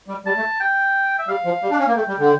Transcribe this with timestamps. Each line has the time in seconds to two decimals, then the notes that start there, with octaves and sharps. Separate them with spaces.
0.08 G3
0.25 G3 A5
0.37 A3
0.60 G5
1.19 E5
1.28 G3 F5
1.45 F3
1.62 G3
1.71 D4
1.79 C#4
1.88 A#3
1.96 A3 G5
2.08 G3
2.18 D3